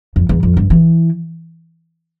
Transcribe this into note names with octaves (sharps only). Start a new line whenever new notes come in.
F2
E2
F2
G2
E3